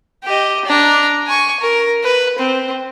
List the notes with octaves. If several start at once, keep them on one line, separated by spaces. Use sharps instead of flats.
G4 D#5
D4 A#5
G#5 C#6
A#4
B4
C4